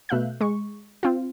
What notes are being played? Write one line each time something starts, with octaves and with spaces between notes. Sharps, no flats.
B2 A3 E5 F5 F#6 G6
G#3 C#6
C4 F4